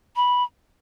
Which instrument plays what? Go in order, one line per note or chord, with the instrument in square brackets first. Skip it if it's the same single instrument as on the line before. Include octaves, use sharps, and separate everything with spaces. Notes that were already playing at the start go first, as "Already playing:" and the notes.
[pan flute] B5